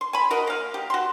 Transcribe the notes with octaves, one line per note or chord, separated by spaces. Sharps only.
C6
G#5 B5
F#4 A#4 D#5
A#3 F5
G4
F#4 C6